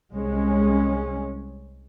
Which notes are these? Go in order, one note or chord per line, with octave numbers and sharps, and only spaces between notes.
C2 G#3 C#4